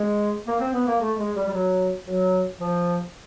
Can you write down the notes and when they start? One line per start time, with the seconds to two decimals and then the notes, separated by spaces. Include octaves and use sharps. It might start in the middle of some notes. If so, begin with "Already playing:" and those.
Already playing: G#3
0.47 A#3
0.60 C4
0.73 B3
0.87 A#3
1.00 A3
1.18 G#3
1.35 G3
1.47 G3
1.53 F#3
2.07 F#3
2.60 F3